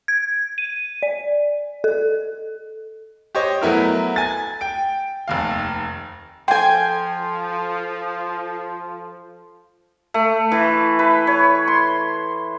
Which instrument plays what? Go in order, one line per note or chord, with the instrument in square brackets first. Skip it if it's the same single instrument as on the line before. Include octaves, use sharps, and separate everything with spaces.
[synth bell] G#6
D#7
D5
A4
[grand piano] G4 C5 C#5 D#5
F#3 A3 B3 E4 A#4
G#5 A6
G5 D7
F1 D#2 F5
[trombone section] F3 [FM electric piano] A4 C6 [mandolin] G5 G#5
[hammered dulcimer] A3
E3
B4
C#5
C6